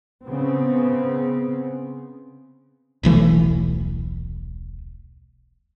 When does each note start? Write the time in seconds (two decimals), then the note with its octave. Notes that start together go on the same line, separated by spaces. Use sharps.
0.24 C#3 B3 C4
3.03 D#1 B1 E3 A3